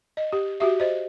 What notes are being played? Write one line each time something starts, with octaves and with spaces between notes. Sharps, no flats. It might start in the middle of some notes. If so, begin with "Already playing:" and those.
D#5
G4
F#4 G4 E5
C5 D#5